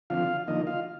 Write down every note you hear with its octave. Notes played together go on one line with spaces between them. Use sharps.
D3 F3 C4 F4 F5
D3 F3 A#3 D#4 D#5
F4 F5